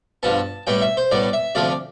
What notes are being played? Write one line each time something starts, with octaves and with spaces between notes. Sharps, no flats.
G2 F3 B3 A5
A2 G3 B3 G5
E5
C5
A2 G3 B3 D5
E5
D2 C3 F3 A3 D5